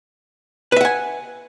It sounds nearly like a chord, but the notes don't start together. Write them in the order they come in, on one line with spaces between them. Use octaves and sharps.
B4 E5 F#5 G#5